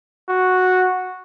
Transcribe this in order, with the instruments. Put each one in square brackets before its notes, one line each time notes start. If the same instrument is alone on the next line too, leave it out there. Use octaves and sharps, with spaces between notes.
[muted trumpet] F#4